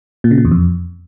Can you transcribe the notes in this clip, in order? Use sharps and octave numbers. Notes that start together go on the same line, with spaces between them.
A#2
C#3
A#2
E2
F2